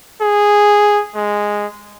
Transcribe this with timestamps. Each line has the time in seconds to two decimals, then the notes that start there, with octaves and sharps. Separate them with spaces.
0.21 G#4
1.15 G#3